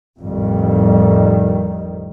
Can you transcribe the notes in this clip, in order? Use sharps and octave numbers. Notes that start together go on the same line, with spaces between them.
A1 F2 D#3 G3